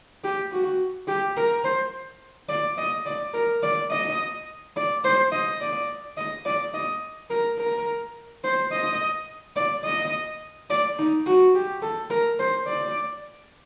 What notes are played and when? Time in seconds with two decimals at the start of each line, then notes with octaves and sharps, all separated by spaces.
0.24 G4
0.52 F#4
1.08 G4
1.37 A#4
1.64 C5
2.49 D5
2.78 D#5
3.06 D5
3.34 A#4
3.63 D5
3.91 D#5
4.76 D5
5.04 C5
5.32 D#5
5.61 D5
6.17 D#5
6.46 D5
6.74 D#5
7.30 A#4
7.59 A#4
8.44 C5
8.72 D#5
9.56 D5
9.85 D#5
10.70 D5
10.98 D#4
11.26 F#4
11.55 G4
11.82 A4
12.10 A#4
12.39 C5
12.67 D5